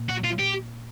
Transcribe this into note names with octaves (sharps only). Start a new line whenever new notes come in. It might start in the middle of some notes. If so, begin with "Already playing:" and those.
Already playing: A#2
F#4
F4
G4